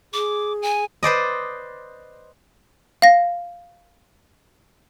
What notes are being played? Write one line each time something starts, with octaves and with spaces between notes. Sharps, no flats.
G#4 D6
G#5
B4 C5 D5 D#5
F5 A#6